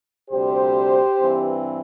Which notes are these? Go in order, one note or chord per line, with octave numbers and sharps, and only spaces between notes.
D2 C3 G3 G4 C5
G2 E3 C4